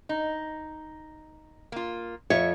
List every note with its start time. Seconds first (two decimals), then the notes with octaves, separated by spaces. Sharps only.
0.09 D#4
1.72 A#3 F4
2.30 F2 C#5 E5